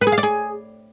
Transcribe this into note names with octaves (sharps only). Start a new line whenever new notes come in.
B4
G#4
F5
D5
G#4